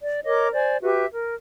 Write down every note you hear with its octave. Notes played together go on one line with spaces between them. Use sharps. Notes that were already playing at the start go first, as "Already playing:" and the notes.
D5
A#4 C#5 D#5 D6
C5 D5 G#5
F#4 G4 B4 E5
A#4